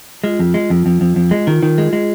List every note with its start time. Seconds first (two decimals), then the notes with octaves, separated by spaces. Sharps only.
0.24 G#3 F4
0.39 F2
0.54 G#3
0.70 F2
0.86 F2
1.01 F2
1.16 F2
1.31 G#3
1.47 D#3 F4
1.63 D#3
1.78 G#3 G#4
1.93 G#3